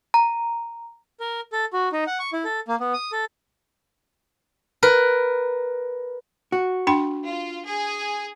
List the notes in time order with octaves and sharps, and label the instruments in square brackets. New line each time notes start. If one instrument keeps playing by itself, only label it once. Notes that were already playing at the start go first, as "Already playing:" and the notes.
[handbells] A#5
[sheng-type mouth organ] A#4
A4
F#4
D#4
F#5
C#6
E4
A4
A#3
B3
D#6
A4
[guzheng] A#4 B4
[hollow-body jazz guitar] F#4
[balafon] D4 G5 B5
[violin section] F4
G#4